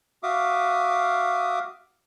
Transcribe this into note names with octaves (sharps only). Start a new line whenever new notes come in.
F#4 E5 F5 D6 D#6